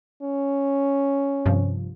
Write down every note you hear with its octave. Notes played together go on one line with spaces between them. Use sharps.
C#4
G2 C3 F3